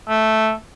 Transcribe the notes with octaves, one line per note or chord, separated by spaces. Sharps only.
A3